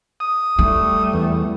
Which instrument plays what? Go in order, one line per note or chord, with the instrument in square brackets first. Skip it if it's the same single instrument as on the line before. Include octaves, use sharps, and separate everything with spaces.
[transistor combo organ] D#6
[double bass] G3 A3 [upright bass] E4
[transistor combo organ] E2